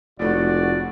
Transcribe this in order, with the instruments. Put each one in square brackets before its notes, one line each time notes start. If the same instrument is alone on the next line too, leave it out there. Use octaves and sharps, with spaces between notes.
[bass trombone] F1 [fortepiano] C#2 A2 A3 [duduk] F#4 [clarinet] D5